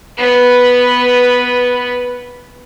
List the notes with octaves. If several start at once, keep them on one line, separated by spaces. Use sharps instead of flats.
B3 B4